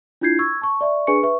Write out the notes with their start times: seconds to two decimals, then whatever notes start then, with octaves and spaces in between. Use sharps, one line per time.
0.21 D4 E4 F4 G6 G#6 C7
0.39 C#6 E6 G#6
0.62 A5 C#6
0.81 D5 E5 C#6
1.07 D4 G#4 B4 G#5 C#6 C#7
1.23 B4 E5 C#6